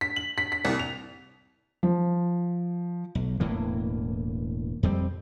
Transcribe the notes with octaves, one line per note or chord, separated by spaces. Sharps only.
B6
F#7
B6
B6
C2
F7
F3
B1
E1 A2 E3 A#3
F2 G3 C4